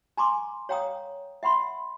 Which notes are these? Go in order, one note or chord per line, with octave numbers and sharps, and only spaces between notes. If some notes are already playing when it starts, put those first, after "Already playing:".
G#5 A#5 C6 D6
C#5 F5 G5 A#5 D#6
E5 F#5 B5 C6